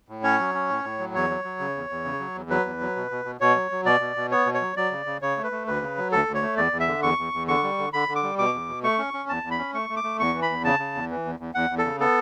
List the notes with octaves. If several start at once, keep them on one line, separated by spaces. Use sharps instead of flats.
A2
C#4 C#5
F#3
C#4
A2
A2
F#3
E2 C#5
F#3
F#3
C#3
E2
E2
C#3
F#3
E2
F#3 B4
E2
F#3
B2
B2
B2
B2 C#5
F#3
F#3
B2 D5
B2
B2
B3 C#5
B2
C#5
F#3
F#3 D5
C#3
C#3
C#3 C#5
A3
B4
A3
D2 B4
C#3
F#3
D2 A4
D2
C#5
A3
E2 D5
E2
E5
D3
E2 C#6
E2
E2
D3 C#6
G3
D3
D3 B5
D3
D6
G3
B2 D6
E2
B2
A3 C#6
C#4
C#4
E2 A5
E2
B5
C#4
A3 C#6
A3
D6
A3
E2 C#6
E3
B5
E2
C#3 A5
C#3
E2
E3
E2
E2
E2 F#5
E2
A4
C#3
B3 A4